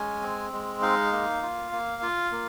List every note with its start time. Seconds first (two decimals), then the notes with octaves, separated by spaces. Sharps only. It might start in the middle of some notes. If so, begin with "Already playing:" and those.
Already playing: G#3 C#4 G#5
0.22 C4
0.53 G#3
0.82 D#4 F5
1.12 A#3
1.43 F4
1.72 A#3
2.03 F4
2.32 A#3